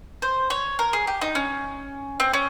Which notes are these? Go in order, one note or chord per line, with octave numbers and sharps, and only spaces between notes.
C5
C#5
A#4
G#4
G4
D#4
C#4
C4
C#4